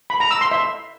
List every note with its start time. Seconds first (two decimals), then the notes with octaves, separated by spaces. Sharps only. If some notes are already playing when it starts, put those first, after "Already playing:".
0.10 B5
0.20 A#5
0.31 E6
0.41 C6
0.51 E5